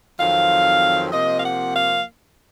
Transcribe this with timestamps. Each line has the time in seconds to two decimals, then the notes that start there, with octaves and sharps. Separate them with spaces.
0.19 F2 D#3 F#3 C4 F5
1.12 C3 F3 A#3 D#5
1.38 F5
1.44 F#5
1.75 F5